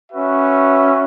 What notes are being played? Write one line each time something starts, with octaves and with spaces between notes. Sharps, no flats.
C#4 F#4 B4 E5